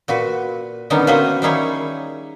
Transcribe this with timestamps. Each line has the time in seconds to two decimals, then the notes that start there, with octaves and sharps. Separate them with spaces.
0.08 A#2 F#4 B4
0.90 D3 D#3 G3 B3 C#4 D#4
1.07 A#3 C#4 F#4 C5 D#5 E5
1.42 D#3 G3 D#4 E4 G#4 C#5